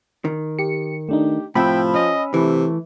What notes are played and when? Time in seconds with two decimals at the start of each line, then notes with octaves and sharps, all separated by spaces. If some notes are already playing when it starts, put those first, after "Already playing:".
0.25 D#3
0.59 G4 C#7
1.09 A3 D4 D#4 G4
1.55 A2 C3 F3 G5 B5 E6
1.94 C#4 D#5
2.34 C3 E3 A3